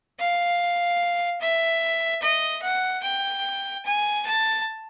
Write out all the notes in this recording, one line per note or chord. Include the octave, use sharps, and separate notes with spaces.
F5
E5
D#5
F#5
G5
G#5
A5